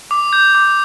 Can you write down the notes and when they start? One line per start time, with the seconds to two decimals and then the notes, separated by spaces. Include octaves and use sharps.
0.11 D6
0.33 G6
0.55 D6